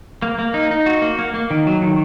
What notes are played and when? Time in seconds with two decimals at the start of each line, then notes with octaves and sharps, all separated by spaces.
0.22 A#3
0.39 A#3
0.54 D#4
0.71 D#4
0.86 F#4
1.02 A#3
1.19 A#3
1.34 A#3
1.50 D#3
1.67 F#3
1.82 D#3